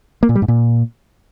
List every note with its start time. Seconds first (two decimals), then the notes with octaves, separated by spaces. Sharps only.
0.23 A#3
0.29 A#2
0.35 G3
0.42 G#2
0.48 A#2